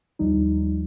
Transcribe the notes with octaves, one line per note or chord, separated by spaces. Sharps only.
D#2 F3 G3 D#4